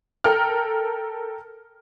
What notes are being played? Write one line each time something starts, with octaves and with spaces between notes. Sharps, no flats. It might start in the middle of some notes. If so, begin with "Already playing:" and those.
A4 A#4 G5 F6